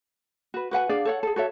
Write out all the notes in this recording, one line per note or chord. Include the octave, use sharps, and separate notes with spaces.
F#4 B4
F#4 B4 F#5 G#5
D4 G#4 D5 F5
A4 C#5 F#5
G#4 A4
F#4 A4 C#5 E5